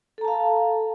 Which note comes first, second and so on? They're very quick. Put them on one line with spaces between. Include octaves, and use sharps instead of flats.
A4 A#5 A5 F5